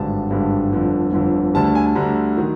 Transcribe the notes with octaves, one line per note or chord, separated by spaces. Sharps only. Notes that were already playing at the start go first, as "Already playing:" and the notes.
Already playing: G#1 G2 D3 A5
G#1 G2 D3
G1 F2 D3
G1 F2 D3
D2 D3 G3 A5
A5
G#5
A5
D2 D3 G3 A#5
D#3 F#3